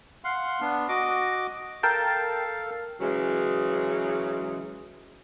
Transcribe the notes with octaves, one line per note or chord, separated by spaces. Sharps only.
F5 F#5 C6
B3 D4
F#4 D#5 D6
A4 A#4 F5 G5 A5
C#3 E3 F#3 G#3